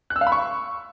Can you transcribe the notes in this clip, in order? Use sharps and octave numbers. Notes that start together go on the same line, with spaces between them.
F#6
E6
F5
B5
C#6